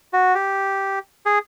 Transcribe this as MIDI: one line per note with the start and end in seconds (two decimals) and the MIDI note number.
0.13 0.34 66
0.35 0.99 67
1.26 1.39 68